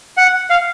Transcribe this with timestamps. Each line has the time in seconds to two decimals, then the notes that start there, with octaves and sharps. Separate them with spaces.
0.17 F#5
0.50 F5